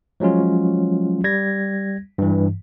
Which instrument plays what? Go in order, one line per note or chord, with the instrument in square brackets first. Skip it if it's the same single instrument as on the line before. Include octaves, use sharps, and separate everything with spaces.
[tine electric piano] F3 F#3 G#3 C#4 F4
G3 G#6 A#6
G2 E3